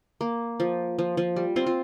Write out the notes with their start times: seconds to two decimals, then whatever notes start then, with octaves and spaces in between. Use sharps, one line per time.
0.21 A#3
0.60 F3
0.99 F3
1.17 F3
1.36 G3
1.56 C4 F4
1.66 F4